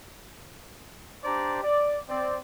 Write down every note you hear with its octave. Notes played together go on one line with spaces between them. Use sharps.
D4 G4 C5 D5 A#5
D5
C4 D5